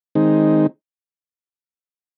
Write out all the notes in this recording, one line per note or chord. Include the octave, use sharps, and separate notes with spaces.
D#3 G#3 C4 D#4